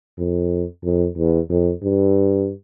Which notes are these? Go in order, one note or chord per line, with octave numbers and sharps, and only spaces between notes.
F2
F2
E2
F2
G2